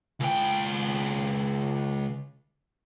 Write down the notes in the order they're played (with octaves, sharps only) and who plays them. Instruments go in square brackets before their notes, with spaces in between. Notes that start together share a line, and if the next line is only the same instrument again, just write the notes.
[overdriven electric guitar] C#2 G5